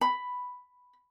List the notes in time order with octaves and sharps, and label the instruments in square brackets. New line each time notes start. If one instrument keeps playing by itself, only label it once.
[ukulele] B5